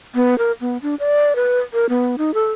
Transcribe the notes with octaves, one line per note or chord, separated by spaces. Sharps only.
B3
A#4
B3
D4
D5
B4
A#4
B3
D#4
A4